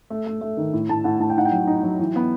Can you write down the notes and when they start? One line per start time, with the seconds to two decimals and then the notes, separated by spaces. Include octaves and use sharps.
0.10 A3
0.26 A3
0.41 A3
0.57 D#3
0.73 A2
0.89 A2 A5
1.04 A2 F#5
1.20 A2 A5
1.30 G5
1.37 D#4 F#5
1.45 G5
1.52 F#3
1.67 D#4
1.83 F#3
2.00 E3
2.16 B3